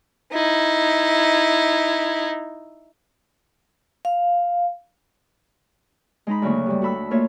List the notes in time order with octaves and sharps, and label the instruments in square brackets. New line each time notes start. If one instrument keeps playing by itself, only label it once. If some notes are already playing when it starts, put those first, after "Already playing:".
[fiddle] D#4 E4
[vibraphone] F5
[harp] G#3 D#4 A#5 B5
D2 C#3 F#3 A#3 C#6
G2 G3
F#4 A4 B5 E6
A3 A#3 F4 C#5 E5